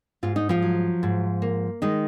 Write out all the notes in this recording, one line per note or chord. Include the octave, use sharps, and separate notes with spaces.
G#2 F4
D#4
F3 F4
F#3
G#2
A#3
D#3 G#3 D#4